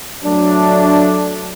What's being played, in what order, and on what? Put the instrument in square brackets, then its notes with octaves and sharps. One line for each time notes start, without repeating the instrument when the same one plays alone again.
[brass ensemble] F#3 A3 D4